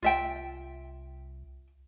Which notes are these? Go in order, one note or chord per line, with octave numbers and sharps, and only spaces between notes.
C2 F4 E5 G5